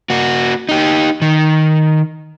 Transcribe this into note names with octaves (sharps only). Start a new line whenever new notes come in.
A#3 F#4
D#4 G4
D#3